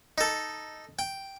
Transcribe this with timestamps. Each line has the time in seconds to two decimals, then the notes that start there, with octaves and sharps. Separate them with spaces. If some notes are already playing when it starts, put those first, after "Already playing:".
0.18 D#4 A4
0.99 G5